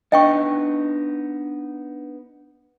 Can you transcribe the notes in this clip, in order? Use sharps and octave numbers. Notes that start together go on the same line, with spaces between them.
B3 D4 D#4 D#5 G5 C#6